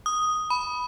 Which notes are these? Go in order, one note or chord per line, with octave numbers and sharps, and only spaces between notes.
D#6
B5